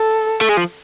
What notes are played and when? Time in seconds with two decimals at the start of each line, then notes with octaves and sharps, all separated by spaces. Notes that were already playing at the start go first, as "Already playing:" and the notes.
Already playing: A4
0.41 A3
0.49 G#3
0.57 F3